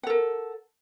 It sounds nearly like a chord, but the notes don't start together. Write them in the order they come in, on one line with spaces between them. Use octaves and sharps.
F#5 A4 A#4